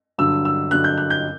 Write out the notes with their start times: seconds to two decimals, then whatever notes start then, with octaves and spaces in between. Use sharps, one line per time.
0.18 G2 D3 F#3 E6
0.45 E6
0.71 G2 D3 F#3 F#6
0.84 G6
0.98 F#6
1.10 G6